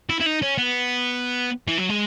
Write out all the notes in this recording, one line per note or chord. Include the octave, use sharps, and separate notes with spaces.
E4
E4
D#4
C#4
B3
E3
F#3
G#3